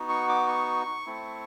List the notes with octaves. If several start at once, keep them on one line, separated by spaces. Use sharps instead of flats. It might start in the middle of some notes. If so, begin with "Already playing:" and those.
Already playing: B3 D#4 F#4
C#6
D6
C#6
A3 C4 E4